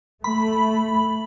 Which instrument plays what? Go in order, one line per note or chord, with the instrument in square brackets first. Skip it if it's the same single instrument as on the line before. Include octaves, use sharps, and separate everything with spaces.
[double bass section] A3 [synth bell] B5